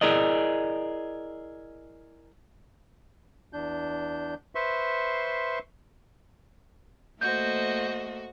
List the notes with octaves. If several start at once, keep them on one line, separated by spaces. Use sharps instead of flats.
E4 G#4 A#4 D5 D#5
E2 D4 G6
B4 C5 E5 C6 C#6
A3 A#3 F#4 C5 D#5 G6